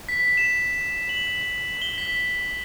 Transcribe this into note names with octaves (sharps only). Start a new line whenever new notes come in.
B6
E7
F#7
G7
B6